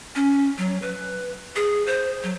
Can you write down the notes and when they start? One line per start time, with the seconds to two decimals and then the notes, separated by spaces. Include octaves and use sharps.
0.15 C#4
0.58 F#3
0.82 B4
1.56 G#4
1.86 C5
2.23 F#3